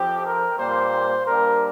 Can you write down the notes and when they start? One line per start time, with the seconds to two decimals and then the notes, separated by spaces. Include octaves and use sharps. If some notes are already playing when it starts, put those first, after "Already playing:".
Already playing: F2 F3 C4 G4
0.24 A#4
0.58 A#2 G3 A#3 C5
1.27 G2 G3 A#3 A#4